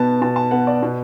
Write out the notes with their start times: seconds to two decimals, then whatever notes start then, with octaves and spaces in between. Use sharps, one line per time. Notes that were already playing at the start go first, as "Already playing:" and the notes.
Already playing: B2 B3 A5
0.21 B2 A5
0.36 A5
0.51 B3 F#5
0.67 D5
0.82 B2